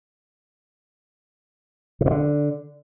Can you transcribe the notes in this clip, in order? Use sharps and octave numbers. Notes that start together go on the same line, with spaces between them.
C3
A2
D3